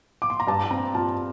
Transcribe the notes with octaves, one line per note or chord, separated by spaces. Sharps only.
D6
C6
A#5
G2 A5
C4 A#5
F4 A5